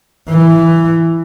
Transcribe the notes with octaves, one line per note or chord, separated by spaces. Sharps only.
E3